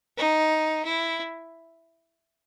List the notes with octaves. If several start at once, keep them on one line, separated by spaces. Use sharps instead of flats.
D#4
E4